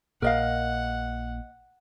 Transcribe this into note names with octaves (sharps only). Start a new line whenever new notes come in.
A#1 A#2 A#4 D#5 F5 F#5